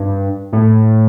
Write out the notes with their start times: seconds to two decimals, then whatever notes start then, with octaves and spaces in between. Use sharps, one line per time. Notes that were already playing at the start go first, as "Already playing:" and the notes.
Already playing: G2
0.53 A2